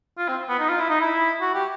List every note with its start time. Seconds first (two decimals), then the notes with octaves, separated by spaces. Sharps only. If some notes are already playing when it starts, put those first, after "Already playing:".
0.18 F4
0.28 C4
0.49 B3
0.59 D#4
0.69 F4
0.80 E4
0.89 D#4
1.01 E4
1.41 F#4
1.55 G4